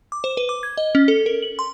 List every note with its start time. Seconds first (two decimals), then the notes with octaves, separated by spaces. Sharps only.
0.12 D6
0.24 C5
0.37 B4
0.49 D6
0.63 G#6
0.77 D#5
0.95 C#4
1.08 A4
1.26 A#4
1.42 F#7
1.59 C6